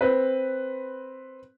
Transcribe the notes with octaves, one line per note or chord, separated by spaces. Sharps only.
C4 B4